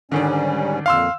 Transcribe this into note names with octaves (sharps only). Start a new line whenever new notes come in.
G#2 D3 D#3 G3 C#4 D4
F2 A#2 F5 C6 E6